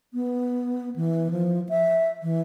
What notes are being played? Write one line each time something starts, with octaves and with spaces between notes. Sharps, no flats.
B3
E3
F3
E5
E3